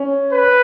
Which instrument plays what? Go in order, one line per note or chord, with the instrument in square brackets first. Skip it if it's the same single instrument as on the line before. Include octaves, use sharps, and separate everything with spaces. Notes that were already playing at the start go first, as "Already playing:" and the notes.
Already playing: [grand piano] C#4
[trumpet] B4